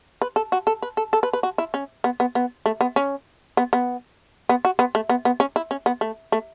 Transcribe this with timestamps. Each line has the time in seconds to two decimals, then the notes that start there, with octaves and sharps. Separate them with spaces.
0.22 B4
0.36 A4
0.52 F#4
0.67 A4
0.82 B4
0.97 A4
1.13 A4
1.23 B4
1.33 B4
1.43 F#4
1.58 E4
1.74 C#4
2.04 B3
2.20 B3
2.35 B3
2.66 A3
2.81 B3
2.96 C#4
3.57 B3
3.73 B3
4.49 B3
4.65 F#4
4.79 B3
4.95 A3
5.09 B3
5.25 B3
5.40 C#4
5.56 E4
5.71 C#4
5.86 B3
6.01 A3
6.32 A3